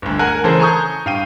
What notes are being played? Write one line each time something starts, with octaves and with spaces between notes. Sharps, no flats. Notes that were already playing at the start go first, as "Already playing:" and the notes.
G1 D2
A#4 F#5 G#5 A#5 F#6
C#3 E3 A4 A#4 C5 A5
G#5 A#5 C#6 D#6 G6
G2 F5 G5 D#7